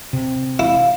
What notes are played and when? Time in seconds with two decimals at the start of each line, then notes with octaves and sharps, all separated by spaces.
0.13 C3
0.59 E4 F5